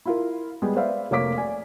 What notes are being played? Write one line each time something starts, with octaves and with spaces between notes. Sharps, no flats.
E4 F4 A#4
G3 G#3 B3 G4 G#4
B4 C5 D5 E5 F5
F1 A#3 C#5 F5 D6 B6
D5 G#5